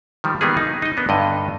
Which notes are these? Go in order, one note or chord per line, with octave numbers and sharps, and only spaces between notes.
D#3 F3 G3
D#3 G3 A#3 B3 G#4
D#4
D#4 D#5
A#3 B3 D4
G2 D3 D#5